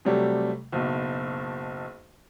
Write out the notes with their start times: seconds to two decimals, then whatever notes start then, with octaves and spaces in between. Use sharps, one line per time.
0.05 C3 F#3 G3 A3
0.72 F#1 B1